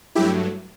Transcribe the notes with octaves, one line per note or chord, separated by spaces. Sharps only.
G2 F#3 A3 E4 G4